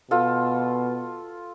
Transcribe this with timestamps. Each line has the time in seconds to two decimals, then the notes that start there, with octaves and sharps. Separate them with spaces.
0.11 B2 F4 A4